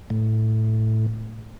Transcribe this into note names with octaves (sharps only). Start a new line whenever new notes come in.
A2